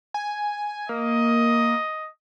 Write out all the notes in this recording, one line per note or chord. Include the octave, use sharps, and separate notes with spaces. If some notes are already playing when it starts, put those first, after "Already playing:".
G#5
A#3 D#5